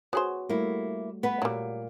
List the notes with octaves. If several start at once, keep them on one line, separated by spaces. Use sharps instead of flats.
B3 F#4 G#4 C5 C#5
G3 A3 A#3 E4
A3 B3 B4
A#2 F#3 G3